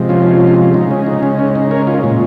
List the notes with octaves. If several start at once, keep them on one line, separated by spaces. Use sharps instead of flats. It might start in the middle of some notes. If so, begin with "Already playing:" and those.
Already playing: C3 F3 G#3
C#4 F4
C#3 G#3 D#4
C#4
D#4
C#4
C#4
D#4
A#4 C#5
C#4 F4
A#2 G#3 C#4